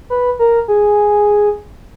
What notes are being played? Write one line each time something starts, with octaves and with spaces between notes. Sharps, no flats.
B4
A#4
G#4